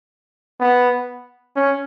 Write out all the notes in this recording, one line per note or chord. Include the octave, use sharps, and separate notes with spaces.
B3
C#4